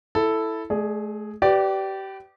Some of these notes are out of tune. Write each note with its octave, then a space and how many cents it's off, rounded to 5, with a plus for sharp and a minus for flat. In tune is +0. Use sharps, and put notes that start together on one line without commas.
E4 +0 A4 +0
A3 -35 G#4 +0 D5 +20
G4 -25 B4 +25 D5 +0